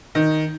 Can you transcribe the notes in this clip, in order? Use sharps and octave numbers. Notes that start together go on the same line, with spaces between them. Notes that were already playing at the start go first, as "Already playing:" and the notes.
D#3